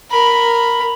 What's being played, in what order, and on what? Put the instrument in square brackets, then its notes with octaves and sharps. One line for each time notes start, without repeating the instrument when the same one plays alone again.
[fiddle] A#4 B5